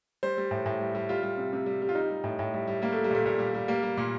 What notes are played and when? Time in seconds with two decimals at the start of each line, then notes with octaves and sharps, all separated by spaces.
0.23 G3 C5
0.38 G3
0.51 A2
0.66 A2
0.80 G3
0.95 G3
1.09 G3 F4
1.23 G3
1.37 C3
1.53 C3
1.66 G3
1.82 G3
1.89 F4
1.95 G3 D#4
2.11 G3
2.24 A2
2.39 A2
2.54 G3
2.67 G3
2.82 G3 A#3
2.92 G3 A3
3.04 G3
3.11 A#2 A3
3.26 A#2
3.39 G3
3.54 G3
3.68 G3 A#3
3.83 G3
3.97 A#2